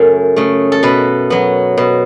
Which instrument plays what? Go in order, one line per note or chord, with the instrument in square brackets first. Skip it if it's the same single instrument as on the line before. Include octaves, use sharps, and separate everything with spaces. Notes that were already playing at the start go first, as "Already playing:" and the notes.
Already playing: [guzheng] F#2 C#3 A3 A4
C#3 A3
A4
B2 B4
F#3 B3
B2